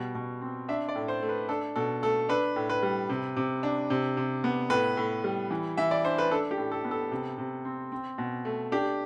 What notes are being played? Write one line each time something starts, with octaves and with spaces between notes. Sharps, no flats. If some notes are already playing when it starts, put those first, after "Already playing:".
Already playing: B2 G3
B2
C4
D4 E5
D5
A2
C5
A3
B4
D4 A4
B2 A4
A3 A4
D4 B4
A2
B4
G3
C3
C3
D4
C3
C3
B3
A2 B4
A2
G3
E3
E3 E5
D5
D4 C5
B4
D4 A4
G4
A2
A4
B3
A4
C3
C3
C4
C4
B2
A3
D4 G4